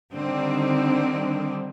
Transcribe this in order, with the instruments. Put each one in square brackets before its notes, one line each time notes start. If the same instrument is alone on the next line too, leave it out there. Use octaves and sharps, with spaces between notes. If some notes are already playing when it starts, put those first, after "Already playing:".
[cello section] D3 D#3 G3 C4